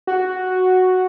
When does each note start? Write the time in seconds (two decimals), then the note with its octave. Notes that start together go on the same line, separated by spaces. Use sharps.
0.07 F#4